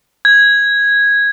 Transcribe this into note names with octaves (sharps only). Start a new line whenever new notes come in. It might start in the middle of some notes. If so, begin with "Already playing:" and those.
G#6